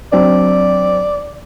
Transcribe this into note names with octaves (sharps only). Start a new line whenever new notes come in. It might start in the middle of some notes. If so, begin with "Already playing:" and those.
F#3 C4 D4 D5